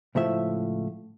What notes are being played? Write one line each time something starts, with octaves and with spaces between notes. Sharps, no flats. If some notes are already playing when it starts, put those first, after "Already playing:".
C#2 A2 F3 E5